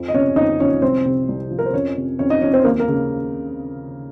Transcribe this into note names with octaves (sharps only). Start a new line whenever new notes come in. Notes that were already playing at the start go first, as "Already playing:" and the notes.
Already playing: F2 F3
D#5
C3 C#4 C#5
F2 D#4 D#5
F3 C#4 C#5
C2 C4 C5
C3
C2
F3
A#4
C5
F2 C#4 C#5
C3
F2 C#4 C#5
D#4 D#5
F3 C#4 C#5
C4 C5
D#2 A#3 A#4
A#3 A#4
C#3